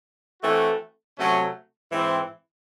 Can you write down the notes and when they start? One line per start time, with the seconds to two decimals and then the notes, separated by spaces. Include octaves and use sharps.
0.43 E3 A3 C4 F#4
1.18 C3 F#3 A3 C#4
1.92 G#2 E3 C4